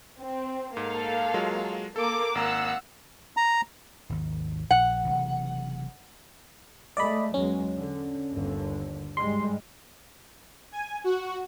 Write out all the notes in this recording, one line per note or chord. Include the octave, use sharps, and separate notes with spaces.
C4
G#2 A#3 A4 F5
F#3 G#3 F4
A#3 A4 D6
G#1 A#3 F5 F#5 A#5 E6
A#5
G#1 D#2
A#1 F#5
F#1 C3 E3
G#3 A3 D5 D#5 B5
E2 F#3 G#3 C#4
D3
G1 D#2 D3
G#2 G3 G#3 C6
G#5
F#4